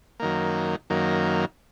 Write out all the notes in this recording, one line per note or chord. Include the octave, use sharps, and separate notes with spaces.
F#2 D#3 A#3
F#2 D#3 A#3